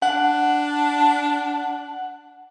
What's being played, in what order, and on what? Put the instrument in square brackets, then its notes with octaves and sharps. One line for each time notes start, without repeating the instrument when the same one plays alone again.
[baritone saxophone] D4 [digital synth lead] F#5